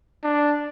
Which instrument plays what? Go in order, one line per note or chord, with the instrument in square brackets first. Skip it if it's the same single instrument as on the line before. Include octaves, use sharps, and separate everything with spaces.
[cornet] D4